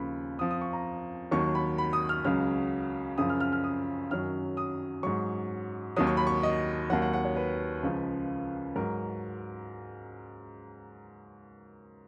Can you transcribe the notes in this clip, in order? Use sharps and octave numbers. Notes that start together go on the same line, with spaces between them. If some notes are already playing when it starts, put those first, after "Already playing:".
Already playing: D#2 C#3 F3 B5
F2 F3 D#6
D#6
C#6
A#5
D#2 D#3 F#3 C#6
B5
B5
D#6
F6
C#2 C#3 F#3 F6
F#2 C#3 F3 D#6
F6
F6
F6
D#6
F#2 D#3 F#3 F6
D#6
G#2 F#3 C#6
D#2 D#3 F#3 D#6
C#6
B5
C#6
D#5
D#2 D#3 F#3 F#5
F#5
F#5
C#5
B4
C#2 C#3 F3
G#2 F#3 A#4